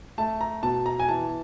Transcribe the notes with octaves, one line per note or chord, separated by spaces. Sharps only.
A3 A5
A#5
B2 A5
A#5
G#5
E3 A5